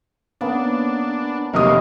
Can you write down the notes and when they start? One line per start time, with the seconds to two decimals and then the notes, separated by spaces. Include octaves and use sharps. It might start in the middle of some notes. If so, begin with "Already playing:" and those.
0.41 C#3 A#3 B3 D4
1.54 F1 F#3 A#3 G4 D#6